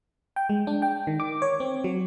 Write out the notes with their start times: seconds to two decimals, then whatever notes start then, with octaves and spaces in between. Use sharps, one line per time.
0.36 G5
0.49 G#3
0.67 D4
0.82 G5
1.07 D#3
1.20 D6
1.42 C#5
1.60 C4
1.84 F#3